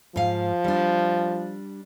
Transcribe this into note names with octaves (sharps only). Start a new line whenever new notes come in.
G#2 F3 F5
G3 D4